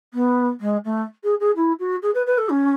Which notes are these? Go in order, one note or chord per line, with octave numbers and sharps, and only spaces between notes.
B3
G#3
A3
G#4
G#4
E4
F#4
G#4
B4
B4
A4
C#4